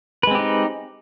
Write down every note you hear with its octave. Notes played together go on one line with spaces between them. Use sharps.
G#3 C4 D#4 G4 B4